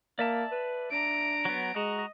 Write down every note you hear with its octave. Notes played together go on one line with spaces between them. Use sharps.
A#3 D5 E5 A5
B4
D4 A#5 D7
F#3 B3
G#3 F#4 D#5 A#5